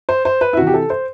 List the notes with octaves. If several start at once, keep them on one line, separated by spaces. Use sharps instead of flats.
C5
C5
B4
E4
C3 E3 F#4
G4
A4
C5